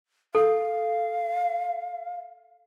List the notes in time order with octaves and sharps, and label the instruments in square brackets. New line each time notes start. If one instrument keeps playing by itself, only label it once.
[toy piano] A4 [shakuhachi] F5